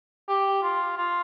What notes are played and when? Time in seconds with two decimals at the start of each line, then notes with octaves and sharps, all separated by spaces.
0.28 G4
0.63 F4
0.98 F4